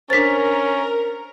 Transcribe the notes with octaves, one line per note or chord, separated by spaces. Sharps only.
C#4 D4 A#4 C5 A6 B6